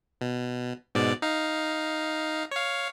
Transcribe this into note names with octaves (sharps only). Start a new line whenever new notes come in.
B2
G#2 B2 D5
D#4 F5
C#5 F5